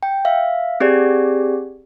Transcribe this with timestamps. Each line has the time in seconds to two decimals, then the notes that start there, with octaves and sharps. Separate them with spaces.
0.03 G5
0.25 E5 F5
0.80 C4 G4 G#4 D5